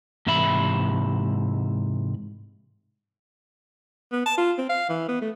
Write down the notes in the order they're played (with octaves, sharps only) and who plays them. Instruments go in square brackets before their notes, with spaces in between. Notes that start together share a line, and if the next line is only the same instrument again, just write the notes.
[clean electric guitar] G#2 C3 E3 E5 B5
[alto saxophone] B3
A5
F4
C4
F5
E3
B3
A3